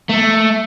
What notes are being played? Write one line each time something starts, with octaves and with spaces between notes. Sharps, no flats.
A3